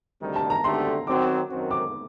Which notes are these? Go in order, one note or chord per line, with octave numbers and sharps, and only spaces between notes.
D2 C3 D#3 G3
A5
A#5
D2 D3 A3 D4 G4 C6
D#3 F#3 C4 F#4 C5 D6
F#2 D#3 F#3 C4 F#4
D6